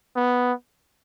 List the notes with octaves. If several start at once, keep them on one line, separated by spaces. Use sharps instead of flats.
B3